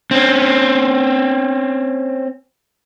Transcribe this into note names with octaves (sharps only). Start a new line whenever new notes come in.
C4 C#4